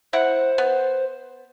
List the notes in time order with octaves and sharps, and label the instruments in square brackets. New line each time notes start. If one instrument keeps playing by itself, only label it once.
[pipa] E4 F#5 [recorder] C5
[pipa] B3